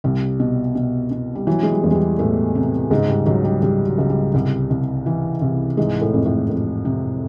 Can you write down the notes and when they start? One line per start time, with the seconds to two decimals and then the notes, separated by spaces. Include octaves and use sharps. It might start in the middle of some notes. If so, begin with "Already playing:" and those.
0.04 C2 G3
0.40 B2
0.75 B2
1.11 B2
1.35 G3
1.47 E3 F#3
1.63 G#3
1.71 G3
1.84 E2
1.91 G#3
1.95 G3
2.19 E2 A2 A3
2.55 C3
2.90 C#2 G#2 G#3
3.08 G3
3.26 C#2 F#3
3.44 G3
3.62 C#2 G3
3.87 F#3
3.98 C#2
4.10 G3
4.34 C2 G3
4.70 C2
5.06 E3
5.42 C2
5.77 G#2 E3 G#3
6.01 A2 A3
6.14 F2
6.26 A2 A3
6.50 F2
6.85 C3